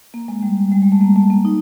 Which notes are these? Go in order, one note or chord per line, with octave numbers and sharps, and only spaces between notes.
A#3
G#3
G3
G3
G#3
A3
A#3
A3
A#3
D#4